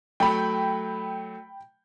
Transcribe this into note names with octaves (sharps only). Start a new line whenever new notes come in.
F#3 A3 G5 B5